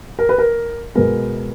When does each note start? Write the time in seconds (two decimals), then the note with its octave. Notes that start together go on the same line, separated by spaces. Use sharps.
0.19 A#4
0.29 B4
0.38 A#4
0.95 B2 G#3 B3 A#4